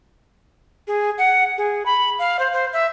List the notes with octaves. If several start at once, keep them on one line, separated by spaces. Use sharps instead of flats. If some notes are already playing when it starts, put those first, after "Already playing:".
G#4
F#5
G#4
B5
F5
C5
C5
E5